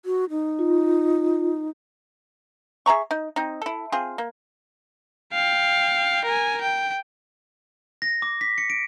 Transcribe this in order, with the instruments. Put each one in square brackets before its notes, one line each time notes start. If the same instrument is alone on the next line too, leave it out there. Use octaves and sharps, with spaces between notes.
[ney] F#4
D#4
[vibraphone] F4
[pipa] G#4 E5 A#5 C#6
D#4
C4 D#4
E4 A4
C4 F4 G#4
A#3
[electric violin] F5 G5
A#4 G#5
G5
[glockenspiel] A#6
D6
B6
C#7
D7